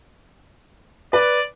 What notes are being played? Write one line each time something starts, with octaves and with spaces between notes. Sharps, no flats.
B4 D5